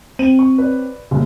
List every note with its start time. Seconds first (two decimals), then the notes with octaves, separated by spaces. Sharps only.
0.19 C4 D#7
0.39 C#6
0.58 B4 C#5 D5
1.11 F#1 D#2